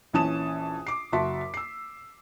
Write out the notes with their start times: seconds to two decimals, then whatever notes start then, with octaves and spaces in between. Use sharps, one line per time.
0.13 A#1 E3 C#4 A5 D#6 E7
0.87 D6 C7
1.13 F#1 F#4 E5 A5 C6 B6
1.54 E6 C7